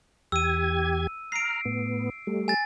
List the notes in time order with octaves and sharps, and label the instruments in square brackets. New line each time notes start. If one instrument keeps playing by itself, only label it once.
[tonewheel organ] E2 G4 G#6 [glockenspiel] E6 D#7
[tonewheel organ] A#5 F6 [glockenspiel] C7 D7
[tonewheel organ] A2 B3
G3 A3
[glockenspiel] G#5 A6